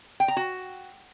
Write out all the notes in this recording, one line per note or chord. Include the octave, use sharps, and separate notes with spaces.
G5
A#5
F#4